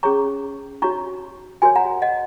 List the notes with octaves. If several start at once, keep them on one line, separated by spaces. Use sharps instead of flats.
C#4 G#4 C#5 A#5 C#6
D#4 F#4 C#5 A#5 C#6
F#4 A#4 C#5 G#5 C6
F#5 A#5
D#5 F#5